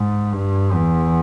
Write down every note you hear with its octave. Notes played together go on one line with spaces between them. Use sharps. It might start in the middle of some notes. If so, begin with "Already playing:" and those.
Already playing: G#2
G2
E2